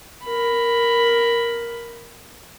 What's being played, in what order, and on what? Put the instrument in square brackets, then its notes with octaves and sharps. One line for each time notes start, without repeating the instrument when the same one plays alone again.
[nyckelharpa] A#4 B5